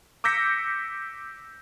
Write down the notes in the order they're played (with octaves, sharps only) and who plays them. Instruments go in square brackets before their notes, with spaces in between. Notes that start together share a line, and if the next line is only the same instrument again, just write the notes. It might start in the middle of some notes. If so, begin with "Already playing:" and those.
[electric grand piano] D6 E6 G6 A#6 B6 C#7